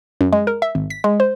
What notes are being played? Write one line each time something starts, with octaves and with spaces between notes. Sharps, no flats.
F#2
G#3
A#4
E5
G#1
B6
G#3
C5